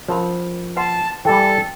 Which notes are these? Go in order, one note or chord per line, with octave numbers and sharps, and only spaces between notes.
F3 C#4 A#4 B5
B4 F#5 A5 C6
E3 G3 A4 G5